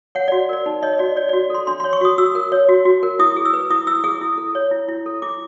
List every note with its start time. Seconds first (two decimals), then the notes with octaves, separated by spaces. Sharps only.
0.15 C#5 F#5
0.28 D5
0.32 F#4
0.49 A#4 D5
0.66 D#4
0.82 C#5 D#5
0.93 D#5
0.99 F#4 D5
1.16 C#5 D5
1.29 D5
1.33 F#4
1.50 A4 C6
1.67 D4 C6
1.80 C6
1.84 C#5
1.93 C#6
2.01 F#4 D#6
2.18 F#4 E6
2.35 A#4
2.52 C#5
2.69 F#4
2.85 F#4
3.03 A#4
3.19 E4 D#6
3.36 G#4
3.45 E6
3.54 B4
3.70 E4 D#6
3.87 E4 E6
4.04 G#4 D#6
4.21 E4
4.38 A4
4.55 C#5
4.71 E4
4.89 E4
5.06 A4
5.22 E4 D6